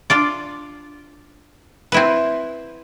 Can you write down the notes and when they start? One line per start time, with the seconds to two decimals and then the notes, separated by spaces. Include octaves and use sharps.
0.10 D4 F4 D5
1.92 C4 E4 B4